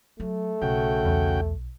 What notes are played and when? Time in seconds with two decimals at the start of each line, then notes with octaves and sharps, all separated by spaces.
0.20 F#3 A3
0.62 B1 C#3 F#4 G5
1.05 E2